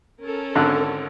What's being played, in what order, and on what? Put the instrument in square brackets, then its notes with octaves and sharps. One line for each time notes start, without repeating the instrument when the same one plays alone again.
[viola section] C#4 A4 A#4
[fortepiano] G#1 D3 F#6